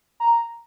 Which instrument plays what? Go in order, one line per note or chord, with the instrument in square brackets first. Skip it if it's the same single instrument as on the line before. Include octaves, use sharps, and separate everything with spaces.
[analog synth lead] A#5